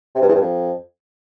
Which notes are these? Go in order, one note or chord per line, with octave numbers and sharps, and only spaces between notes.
C3
G2
E2
G2
F2